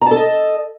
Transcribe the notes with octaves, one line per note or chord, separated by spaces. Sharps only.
A4 D#5 A5 A#5